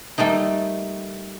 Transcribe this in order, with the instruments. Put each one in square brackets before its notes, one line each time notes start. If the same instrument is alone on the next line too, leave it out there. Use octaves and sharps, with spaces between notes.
[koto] G3 A3 A#3 D#4